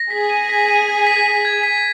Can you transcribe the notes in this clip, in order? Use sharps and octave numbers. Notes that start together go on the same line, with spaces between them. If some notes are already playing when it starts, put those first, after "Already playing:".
Already playing: A#6
G#4 B6
D#7
B6
D#7
B6
B6
B6
G#6
B6